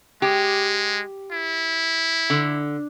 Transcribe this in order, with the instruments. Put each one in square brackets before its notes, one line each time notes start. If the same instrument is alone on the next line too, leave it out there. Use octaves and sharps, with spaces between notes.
[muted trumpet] G#3 [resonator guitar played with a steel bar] G4
[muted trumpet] E4
[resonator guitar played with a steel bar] D3